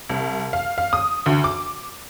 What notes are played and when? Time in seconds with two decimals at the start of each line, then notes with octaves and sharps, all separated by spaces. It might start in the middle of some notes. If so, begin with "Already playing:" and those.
0.09 C2
0.53 F5
0.78 F5
0.93 D#6
1.26 D2
1.44 D6